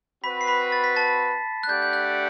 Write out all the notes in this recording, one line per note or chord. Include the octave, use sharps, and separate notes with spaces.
C4 F#4 B4 B5 B6
C7
B5 B6
A6
B6
A5 A6
F#6
A3 D4 G4 D5 F#5 G6
G6
F#6